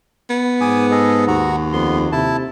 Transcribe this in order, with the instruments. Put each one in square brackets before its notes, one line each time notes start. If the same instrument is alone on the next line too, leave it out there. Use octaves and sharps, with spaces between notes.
[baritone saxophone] B3
[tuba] G#2 [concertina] G#5 D6 D#6
[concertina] G#4 A4 D#5
[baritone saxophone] D#2 [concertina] F#4 F#5 A#5
[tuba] F2 [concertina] B3 C6
[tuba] C3 [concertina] E4 A5